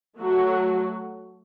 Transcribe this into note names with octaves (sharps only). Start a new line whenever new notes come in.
F#3 A3 F#4